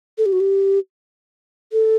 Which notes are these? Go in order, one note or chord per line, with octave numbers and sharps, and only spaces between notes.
A4
G4
F#4
G4
A4